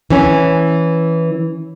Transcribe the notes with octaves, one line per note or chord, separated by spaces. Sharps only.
E3 C#4